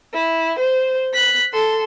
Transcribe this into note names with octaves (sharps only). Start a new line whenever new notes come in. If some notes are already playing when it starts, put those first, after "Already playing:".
E4
C5
F#6 B6
A4 C6